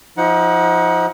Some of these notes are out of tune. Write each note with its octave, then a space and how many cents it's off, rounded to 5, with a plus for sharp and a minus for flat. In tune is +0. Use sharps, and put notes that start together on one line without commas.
F3 +0 D#4 +35 F#5 +0